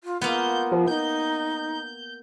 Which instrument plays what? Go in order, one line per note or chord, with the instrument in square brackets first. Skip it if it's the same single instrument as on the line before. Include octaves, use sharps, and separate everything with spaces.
[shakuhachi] F4
[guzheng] A#3 B3 [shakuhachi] F4 [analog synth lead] G6
[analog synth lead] F3
[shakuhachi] D#4 [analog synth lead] G6